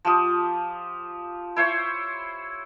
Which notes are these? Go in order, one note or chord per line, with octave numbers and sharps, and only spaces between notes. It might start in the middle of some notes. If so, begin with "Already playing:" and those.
F3 G4 D#6
E4 C5 C#5